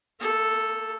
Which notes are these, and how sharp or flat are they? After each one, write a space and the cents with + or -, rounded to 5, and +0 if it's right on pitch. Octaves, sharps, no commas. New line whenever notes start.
A#3 -40 A4 +0